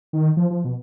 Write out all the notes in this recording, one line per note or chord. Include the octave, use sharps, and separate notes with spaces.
D#3
F3
F3
B2